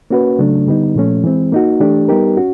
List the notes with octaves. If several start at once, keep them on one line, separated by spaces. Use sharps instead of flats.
A#3 C#4 F#4 B4
C#3 F#3 A3 D4
D3 G3 B3 D#4
A#2 F3 A3 C#4
E3 G#3 C4
A#3 D#4 F#4
E3 A3 D4 G4
G3 B3 D#4 G4 A#4
C#4 F#4